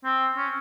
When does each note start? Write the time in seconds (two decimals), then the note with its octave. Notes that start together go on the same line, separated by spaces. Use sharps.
0.04 C4
0.37 C#4